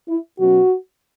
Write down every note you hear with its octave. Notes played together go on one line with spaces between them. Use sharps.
E4
B2 F#3 C#4 F#4